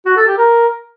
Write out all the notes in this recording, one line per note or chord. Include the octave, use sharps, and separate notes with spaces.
F#4
A4
G4
A#4